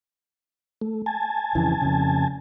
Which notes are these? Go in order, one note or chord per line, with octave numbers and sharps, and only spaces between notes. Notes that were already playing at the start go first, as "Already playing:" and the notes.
A3
G#5 A5
F2 C#3 E3
F2 C#3